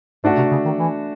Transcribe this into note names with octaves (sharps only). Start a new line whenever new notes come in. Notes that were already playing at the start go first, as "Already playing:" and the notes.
G#2 A3 D4 F#4
C3
C#3
D#3
E3